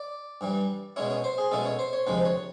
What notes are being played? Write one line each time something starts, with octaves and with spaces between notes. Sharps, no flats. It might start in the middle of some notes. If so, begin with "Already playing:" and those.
Already playing: D5
G2 E3 G3
B2 G#3 C#4 E4 C#5
C#5
C5
G#4
B2 G#3 C#4 E4 A4
C#5
C5
C#5
D2 C3 F3 G#3 B4
C#5